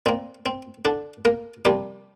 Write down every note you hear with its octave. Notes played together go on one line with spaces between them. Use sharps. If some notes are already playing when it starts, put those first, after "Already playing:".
A#2 A#3 C4
C4
D3 D4
A#3 A#4
C3 F3 G3 A#3 G4